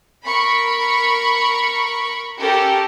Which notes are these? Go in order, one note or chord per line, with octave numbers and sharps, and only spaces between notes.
A#4 B5 C#6
C#4 G4 A4 A#4